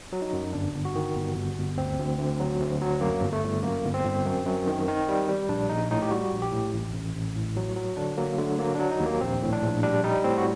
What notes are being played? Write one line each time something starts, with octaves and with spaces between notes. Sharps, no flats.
F#3
D#4
F#2
G1 D4
G1
F#4
D#3
G1
G1
G1
D2 C4
D2
D2
F#3
D2
F#3
F#2 A#3
G1
A3
G1
F#2 A#3
G1
C4
G1
F#2
F#2
D#3
D#3
G3
G3
A#1 D4
A#1 D#4
A2 D#4
G4
G3 F#4
A#1
G4
A2
A1
A1
A1
A2
F#3
F#3
D3 D4
F#3 A#3
D3 A3
F#3 A#3
F#3 D4
D#4
D#2
A#3
A#1 C4
A2
D4
A#1
G3 D4
G3 D#4
A2 C4
F#4